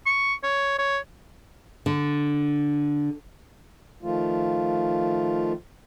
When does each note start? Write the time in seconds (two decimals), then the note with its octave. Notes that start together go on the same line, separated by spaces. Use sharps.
0.06 C#6
0.43 C#5
0.78 C#5
1.86 D3
4.03 D#3 F3 A3 F4